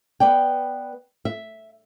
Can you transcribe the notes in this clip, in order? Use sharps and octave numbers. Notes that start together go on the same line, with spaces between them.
B3 B4 D5 G5
E5